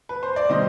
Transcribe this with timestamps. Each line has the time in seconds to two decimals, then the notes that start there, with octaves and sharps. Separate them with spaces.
0.09 B4
0.23 C5
0.36 D5
0.49 C3 D#3 G3 C5 D#5